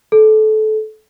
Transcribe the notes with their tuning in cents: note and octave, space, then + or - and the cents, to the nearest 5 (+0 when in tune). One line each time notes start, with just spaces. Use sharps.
A4 -25